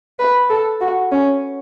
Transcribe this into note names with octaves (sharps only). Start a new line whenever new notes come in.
B4
A4
F#4
C#4